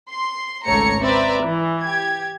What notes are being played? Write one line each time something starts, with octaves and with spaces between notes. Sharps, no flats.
C6
G#1 C#2 A3 C#5 A#5 C#7
C4 B4 D5 E5 A#5
E3
G4 G#6